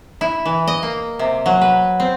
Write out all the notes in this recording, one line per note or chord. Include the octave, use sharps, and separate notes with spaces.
E4
E3
D#5
A#3
C3
F#3
B4
C4